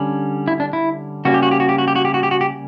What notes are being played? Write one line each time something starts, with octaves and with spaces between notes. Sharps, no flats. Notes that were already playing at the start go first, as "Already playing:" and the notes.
Already playing: D3 G3 C#4
E4
D4
E4
C#3 G3 A#3 C#4 F#4
G4
F#4
G4
F#4
G4
F#4
G4
F#4
G4
F#4
G4
F#4
G4